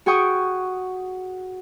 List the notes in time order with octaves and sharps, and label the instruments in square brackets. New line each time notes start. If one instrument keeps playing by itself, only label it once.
[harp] F#4 G#4 G5 C#6 D#6